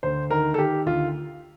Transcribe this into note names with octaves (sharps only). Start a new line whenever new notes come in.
D2 C5
D#3 A#4
A4
D#3 G4
D2 F4